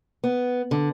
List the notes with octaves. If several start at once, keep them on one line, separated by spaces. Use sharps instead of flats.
B3
D3